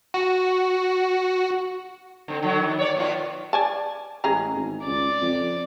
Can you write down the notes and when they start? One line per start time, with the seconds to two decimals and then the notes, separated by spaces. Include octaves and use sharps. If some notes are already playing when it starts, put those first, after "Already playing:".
0.14 F#4
2.28 D3 C4
2.42 D3 D#3 F#3
2.60 D#3
2.79 C#5 D5
2.97 B2 D#3 F4
3.53 D5 G#5 A5
4.24 A1 G#3 G#4 A#5
4.56 G#1
4.86 C#2 D5
5.22 F2